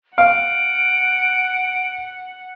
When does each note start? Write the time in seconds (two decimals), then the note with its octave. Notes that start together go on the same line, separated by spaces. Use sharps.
0.18 F5 F#5 D7